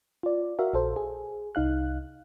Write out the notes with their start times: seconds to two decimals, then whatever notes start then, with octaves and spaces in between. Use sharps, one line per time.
0.23 F4 D5
0.59 F#4 A#4 E5 F5
0.74 A#1 A4 C5
0.96 G#4
1.55 C2 D#4 F5 F#6